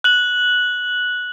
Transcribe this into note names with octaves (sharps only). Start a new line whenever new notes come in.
F#6 F#7